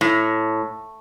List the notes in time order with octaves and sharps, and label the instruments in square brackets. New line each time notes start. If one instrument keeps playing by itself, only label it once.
[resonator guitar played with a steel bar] A2